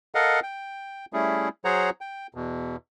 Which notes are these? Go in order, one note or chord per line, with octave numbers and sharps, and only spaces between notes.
A4 A#4 D#5 F5 F#5
G5
G3 A3 C#4 E4 G#4
F#3 G#4 C5 C#5 F#5 A#5
G5
E2 B2